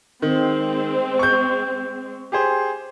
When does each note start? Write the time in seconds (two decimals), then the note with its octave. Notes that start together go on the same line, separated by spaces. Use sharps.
0.22 D#3 G#3 C4
1.19 C#6 G6
2.32 G4 G#4 C5